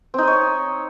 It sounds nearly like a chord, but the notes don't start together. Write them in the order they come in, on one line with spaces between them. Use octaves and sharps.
C4 D#4 D#5 C#5